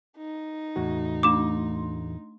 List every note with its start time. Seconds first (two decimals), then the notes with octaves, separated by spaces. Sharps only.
0.17 D#4
0.76 E2 A2 F#4
1.23 A3 D4 C6 D6 E7